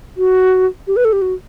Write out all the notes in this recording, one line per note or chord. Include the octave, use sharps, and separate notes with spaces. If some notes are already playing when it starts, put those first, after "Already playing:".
F#4
G4
B4
A4
G4
F#4